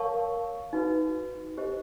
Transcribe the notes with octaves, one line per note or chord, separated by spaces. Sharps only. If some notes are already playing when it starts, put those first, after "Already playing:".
Already playing: A#4 C#5 F5 A5 C#6
D#4 F#4 B4
D#4 G4 C5 D#5